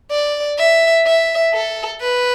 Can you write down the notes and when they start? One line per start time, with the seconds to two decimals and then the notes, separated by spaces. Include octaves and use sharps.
0.11 D5
0.59 E5
1.07 E5
1.53 A4
2.01 B4